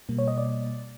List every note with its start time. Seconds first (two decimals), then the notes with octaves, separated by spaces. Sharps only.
0.09 B2 G3 A#3
0.18 C#5
0.28 D#5
0.38 D5